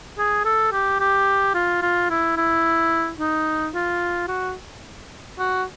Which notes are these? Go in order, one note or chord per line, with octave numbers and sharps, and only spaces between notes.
G#4
A4
G4
G4
F4
F4
E4
E4
D#4
F4
F#4
F#4